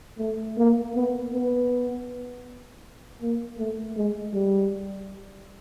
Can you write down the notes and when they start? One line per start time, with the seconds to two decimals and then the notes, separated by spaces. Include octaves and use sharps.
0.19 A3
0.58 A#3
0.95 B3
1.33 B3
3.21 A#3
3.58 A3
3.96 G#3
4.34 G3